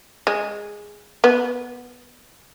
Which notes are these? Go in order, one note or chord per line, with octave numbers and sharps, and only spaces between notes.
G#3
B3